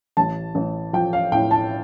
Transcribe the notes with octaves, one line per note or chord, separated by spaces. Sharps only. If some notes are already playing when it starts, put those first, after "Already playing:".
A1 A5
A1
F3 G5
F5
A2 G5
A5